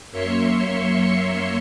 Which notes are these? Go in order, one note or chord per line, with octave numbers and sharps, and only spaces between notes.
F#2 A#3 C#5 E5 C6 C#7